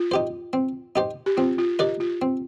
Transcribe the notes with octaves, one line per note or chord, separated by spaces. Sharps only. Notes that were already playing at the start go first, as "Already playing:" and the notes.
Already playing: F4
D#4 G4 C5
C4
D#4 G4 C5
G4
C4 F4
F4
D#4 G4 A#4 D5
F4
C4